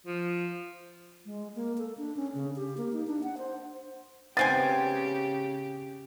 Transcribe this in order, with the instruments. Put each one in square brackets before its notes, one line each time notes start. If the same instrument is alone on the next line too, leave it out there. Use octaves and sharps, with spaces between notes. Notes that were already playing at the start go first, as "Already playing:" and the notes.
[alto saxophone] F3
[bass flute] G#3
A#3
A4
D4
C#4
C#3
G4
A#3
D#4
D4
F#5
C5
[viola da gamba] C#3 G4 [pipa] B3 C4 G#5 [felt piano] A6